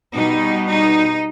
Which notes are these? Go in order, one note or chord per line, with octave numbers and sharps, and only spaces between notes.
B2 G3 B3 D#4
D#4